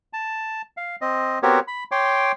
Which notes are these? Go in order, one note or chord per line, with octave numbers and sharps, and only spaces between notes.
A5
F5
C4 D#5
B3 C4 F#4 G4 A#4 C#5
B5
C#5 G5 C6 D6